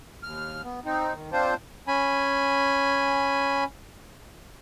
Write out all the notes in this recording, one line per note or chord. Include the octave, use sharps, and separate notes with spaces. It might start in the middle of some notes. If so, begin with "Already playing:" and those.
D#2 F6
B3
C4 D#4
D#3
C4 D4 F4 C5
C#4 G#5 B5